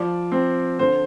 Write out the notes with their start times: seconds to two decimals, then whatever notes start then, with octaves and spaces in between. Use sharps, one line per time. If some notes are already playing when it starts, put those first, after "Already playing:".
Already playing: F3 D5
0.32 C4
0.79 D3 C5